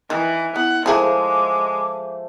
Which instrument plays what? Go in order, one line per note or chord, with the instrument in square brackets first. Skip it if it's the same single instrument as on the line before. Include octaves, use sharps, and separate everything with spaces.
[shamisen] D#3 [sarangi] E3
[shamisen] B3 [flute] E4 [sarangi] F#5
[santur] F3 A3 C5 [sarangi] G#3 [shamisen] E4 G#4 A#4 [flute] D6